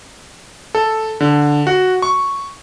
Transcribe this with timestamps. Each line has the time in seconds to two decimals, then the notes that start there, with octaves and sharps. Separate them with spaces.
0.75 A4
1.20 D3
1.67 F#4
2.02 C#6